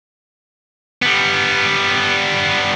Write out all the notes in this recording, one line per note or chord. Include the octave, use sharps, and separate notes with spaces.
G3 B3